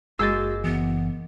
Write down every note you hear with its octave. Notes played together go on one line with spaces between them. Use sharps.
F#1 G#3 A#3 F#4 G#4 E6 G6 A6
F#1 E3 B3